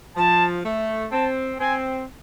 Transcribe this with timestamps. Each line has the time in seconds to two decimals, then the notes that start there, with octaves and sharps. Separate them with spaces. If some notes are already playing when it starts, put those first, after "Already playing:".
0.17 F3 A5
0.65 A3
1.12 C4 A5
1.60 C4 G#5